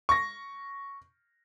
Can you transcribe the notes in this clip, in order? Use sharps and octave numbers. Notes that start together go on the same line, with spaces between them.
C#6 A#6